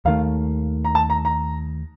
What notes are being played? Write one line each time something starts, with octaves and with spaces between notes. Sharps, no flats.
D#2 D#3 A3 F5
A#5
A5
A#5
A#5